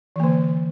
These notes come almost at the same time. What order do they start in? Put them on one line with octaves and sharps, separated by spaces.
E3 A#3 D3